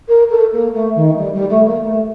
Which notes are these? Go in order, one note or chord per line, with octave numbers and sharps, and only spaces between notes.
A#4
A4
A#3
A3
D#3
G3
G3
A3
A#3
A3